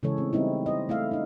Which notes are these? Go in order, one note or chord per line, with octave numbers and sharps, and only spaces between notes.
C#3 E3 G#3 G#4 A4 C#5
A3 C4
G3 B3 C4 D#4 E4
C5 D#5
A3 E4 E5 F5
D4 D#4